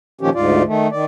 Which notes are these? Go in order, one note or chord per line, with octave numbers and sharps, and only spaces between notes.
A#2 D#3 F3 C#4 G4
D2 G#2 F4 D5
D#3 A3
D#3 D5